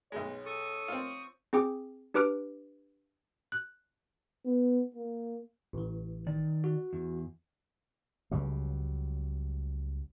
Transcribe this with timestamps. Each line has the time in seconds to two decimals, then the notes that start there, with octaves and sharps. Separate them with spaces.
0.12 B1 G#3 C#5
0.46 A4 C#6 D#6
0.88 C4 F4
1.53 C4 G#4 G5 D6
2.14 D4 G4 B4 D6 F6 D7
3.52 F#6
4.45 B3
4.95 A#3
5.73 A1 E3
6.27 D#3 D5
6.64 F#4
6.93 E2
8.31 C#2 F#3 G3